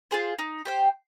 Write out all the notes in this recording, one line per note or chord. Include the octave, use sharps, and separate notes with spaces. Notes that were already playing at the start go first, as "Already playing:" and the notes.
F4 G#4 C5
D#4
G4 C5 G5